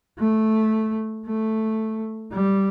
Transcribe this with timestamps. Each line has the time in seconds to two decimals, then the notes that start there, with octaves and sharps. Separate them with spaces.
0.18 A3
1.26 A3
2.32 G3